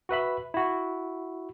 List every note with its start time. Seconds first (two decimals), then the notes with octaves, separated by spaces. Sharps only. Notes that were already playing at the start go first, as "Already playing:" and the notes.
0.09 F#4 B4 E5 B5
0.54 E4 F#4